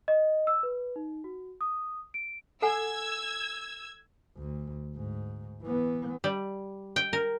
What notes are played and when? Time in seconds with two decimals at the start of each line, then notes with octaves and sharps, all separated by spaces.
0.08 D#5
0.47 E6
0.63 B4
0.96 D#4
1.24 F#4
1.61 D#6
2.14 D7
2.62 A4 F#5 G#5 E6 G#6
4.36 D2
4.96 G#2
5.62 E3 B3
6.24 G3
6.96 G5
7.13 A#4